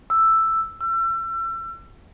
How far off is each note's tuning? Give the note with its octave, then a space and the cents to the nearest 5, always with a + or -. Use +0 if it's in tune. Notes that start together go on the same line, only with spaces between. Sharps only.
E6 +5
E6 +35